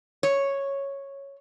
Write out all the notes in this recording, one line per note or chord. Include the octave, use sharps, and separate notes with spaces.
C#5